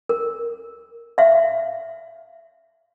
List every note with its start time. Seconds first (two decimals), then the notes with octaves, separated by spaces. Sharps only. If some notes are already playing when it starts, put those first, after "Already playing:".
0.09 A#4
1.18 E5 F5